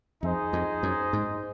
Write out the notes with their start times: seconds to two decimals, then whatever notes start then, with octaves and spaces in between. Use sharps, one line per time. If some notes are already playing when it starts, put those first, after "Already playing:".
0.22 F2 D#4 G#4 C5 D#5
0.53 F2
0.83 F#2
1.13 G#2